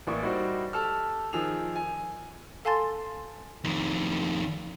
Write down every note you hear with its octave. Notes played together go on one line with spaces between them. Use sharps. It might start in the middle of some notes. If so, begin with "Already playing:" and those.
A1 E3 A#3 D5 C#6
G3 D#4 E4 F#4 C5 D5
G4 A4 E6 F6
D#3 F3 G#4 E6 F7
G#5
A4 F5 G#5 A5 C6 A6
F2 D#3